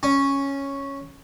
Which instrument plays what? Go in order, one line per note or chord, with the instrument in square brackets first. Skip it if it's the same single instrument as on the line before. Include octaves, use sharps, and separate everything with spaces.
[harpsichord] C#4